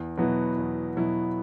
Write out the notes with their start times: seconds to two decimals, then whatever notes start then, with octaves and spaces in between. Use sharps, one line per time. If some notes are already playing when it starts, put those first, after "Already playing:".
Already playing: E2
0.18 B2 F#3 B3 E4
0.57 E2
0.97 B2 F#3 B3 E4